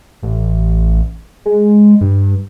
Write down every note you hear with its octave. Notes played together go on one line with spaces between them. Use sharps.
A1
G#3
G2